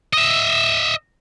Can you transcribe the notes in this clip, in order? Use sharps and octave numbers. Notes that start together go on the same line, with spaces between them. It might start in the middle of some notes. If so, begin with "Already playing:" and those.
D#5 E5